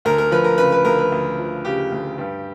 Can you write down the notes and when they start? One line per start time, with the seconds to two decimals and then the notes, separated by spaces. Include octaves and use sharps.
0.05 D2 A#4
0.18 A#4
0.31 F3 B4
0.44 A#4
0.58 C#3 B4
0.72 B4
0.85 D2 A#4
0.98 B4
1.12 D2
1.38 F3
1.65 C#3 G4
1.92 D2
2.18 G2